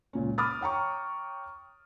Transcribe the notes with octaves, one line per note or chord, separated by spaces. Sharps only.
C#2 A#2 C#4
B5 D6 D#6 F6 A6
C#5 G5 A#5 C#6